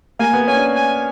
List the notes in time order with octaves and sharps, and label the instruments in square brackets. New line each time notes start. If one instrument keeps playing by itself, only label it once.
[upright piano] A#3 [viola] G#5
[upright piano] B3
[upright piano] C#4 [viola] G#5
[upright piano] D4
[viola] G#5